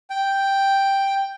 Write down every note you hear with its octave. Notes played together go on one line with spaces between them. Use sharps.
G5